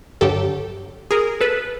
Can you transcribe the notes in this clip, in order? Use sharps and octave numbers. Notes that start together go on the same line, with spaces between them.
G2 D3 F#3 G4 A4
G#4 A#4
A4 B4